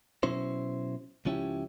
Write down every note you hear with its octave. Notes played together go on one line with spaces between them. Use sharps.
B2 F#3 C#4 E4 C5
C#2 F3 C#4 E4 G4